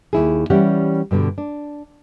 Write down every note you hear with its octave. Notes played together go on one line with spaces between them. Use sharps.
D#2 E4 G#4
E3 G3 C#4 G4 D5 F#5
G2 B2 D3 G3
D4